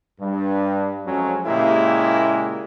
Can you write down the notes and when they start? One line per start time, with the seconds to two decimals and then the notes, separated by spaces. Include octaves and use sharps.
0.20 G2
1.06 F2 F#3 G#3 C#4
1.46 A#2 C#3 G#3 A#3 E4 G4